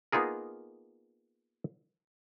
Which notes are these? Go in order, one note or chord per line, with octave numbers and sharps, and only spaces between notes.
A#3 B3 D#4 F4 G#4 A#4